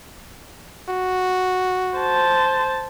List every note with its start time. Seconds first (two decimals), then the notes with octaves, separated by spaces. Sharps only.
0.89 F#4
1.98 C5 A5